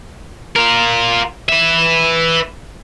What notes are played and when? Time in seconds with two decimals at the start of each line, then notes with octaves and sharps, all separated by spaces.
0.56 F4 A#4
1.49 B4 E5